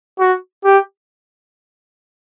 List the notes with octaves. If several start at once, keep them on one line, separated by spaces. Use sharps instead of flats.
F#4
G4